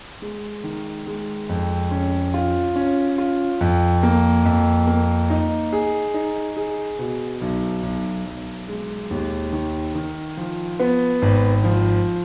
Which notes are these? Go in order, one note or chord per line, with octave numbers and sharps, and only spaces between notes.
G#3
D#3
G#3
F2
C#4
F4
C#4
F4
F2
A#3
F2
A#3
D#4
G#4
D#4
G#4
B2
B1
B1
B1
G#3
D#2
D#3
D#3
F3
B3
G#1
F3